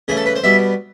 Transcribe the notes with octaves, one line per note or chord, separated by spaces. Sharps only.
C#3 E3 A3 G#4
A4
B4
C5
B2 G3 B3 E5